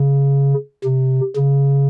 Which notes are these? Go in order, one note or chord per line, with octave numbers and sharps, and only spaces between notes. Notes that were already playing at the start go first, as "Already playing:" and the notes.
Already playing: C#3
C3
C#3